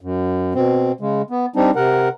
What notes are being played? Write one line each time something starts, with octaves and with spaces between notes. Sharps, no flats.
F#2
B2 C4
C#3 G#3
B3
G3 C4 D4 D#4
C3 A#4 F#5